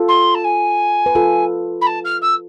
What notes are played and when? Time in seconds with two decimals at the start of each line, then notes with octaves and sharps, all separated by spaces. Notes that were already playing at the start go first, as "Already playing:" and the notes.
Already playing: F4 A4
0.08 C6
0.35 A5
0.44 G#5
1.06 B4
1.15 F4 A4
1.81 B5
1.87 A5
2.05 F6
2.22 E6